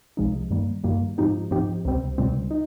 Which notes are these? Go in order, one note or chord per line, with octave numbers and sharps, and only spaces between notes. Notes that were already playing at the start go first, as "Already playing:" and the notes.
C2 C3 F3 G#3 D#4
G2 D#3 G3 A#3
G2 D#3 G3 A#3
G#2 F3 C4 D#4 G4
G#2 F3 C4 D#4 G4
C#2 C3 G3 C4
C#2 C3 G3 C4
D#4